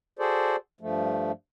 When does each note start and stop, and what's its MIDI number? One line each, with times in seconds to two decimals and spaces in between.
0.19 0.56 66
0.19 0.56 68
0.19 0.56 69
0.19 0.56 72
0.19 0.56 74
0.81 1.32 43
0.81 1.32 53
0.81 1.32 57